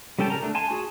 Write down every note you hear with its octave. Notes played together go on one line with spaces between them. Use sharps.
G3 C#4 A4 G5 A5
C#3 A#4 A#5
A3 D4
G#5 A5 C6
F#4 G#4